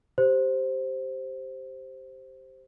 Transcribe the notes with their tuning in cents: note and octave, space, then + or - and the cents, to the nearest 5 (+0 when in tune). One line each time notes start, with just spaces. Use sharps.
G4 -5 C5 +0